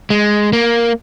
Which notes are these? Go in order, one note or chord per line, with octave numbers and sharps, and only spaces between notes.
G#3
A#3